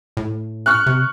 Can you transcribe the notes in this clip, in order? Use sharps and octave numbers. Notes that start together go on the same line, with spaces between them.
A2
C#6 F6 F#6
C3